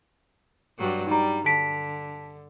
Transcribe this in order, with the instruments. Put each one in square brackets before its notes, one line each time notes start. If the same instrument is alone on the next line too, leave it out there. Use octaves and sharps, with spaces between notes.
[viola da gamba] G2 F#3 G3
[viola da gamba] G3 [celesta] D#4 A#5
[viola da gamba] D3 [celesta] A5 B6 D7